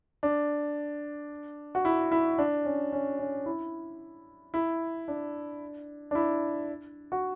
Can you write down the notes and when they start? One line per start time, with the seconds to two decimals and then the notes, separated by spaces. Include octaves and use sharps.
0.23 D4
1.75 F#4
1.85 E4
2.12 E4
2.38 D4
2.65 C#4
2.92 C#4
3.19 C#4
3.46 E4
4.54 E4
5.08 D4
6.11 D4
6.15 E4
7.12 F#4